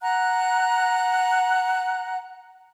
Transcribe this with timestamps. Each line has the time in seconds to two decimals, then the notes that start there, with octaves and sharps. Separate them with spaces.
0.02 F#5 A#5 F#6